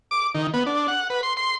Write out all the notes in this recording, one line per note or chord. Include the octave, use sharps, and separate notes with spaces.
D6
D#3
B3
D4
F#5
B4
C6
C6